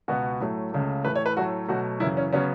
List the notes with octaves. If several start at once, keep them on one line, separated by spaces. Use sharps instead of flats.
C#2 B2 B3 F#4
A2 F#3 A3
C#2 C#3 A3
A2 E3 A3 B4
C#5
B4
A2 F#3 A3 F#4
B2 F#3 A3 F#4
F#2 C#3 E3 E4
C#4
C#3 F#3 B3 C#4